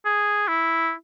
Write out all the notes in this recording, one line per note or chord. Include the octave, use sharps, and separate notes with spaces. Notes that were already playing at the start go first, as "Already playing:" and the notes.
G#4
E4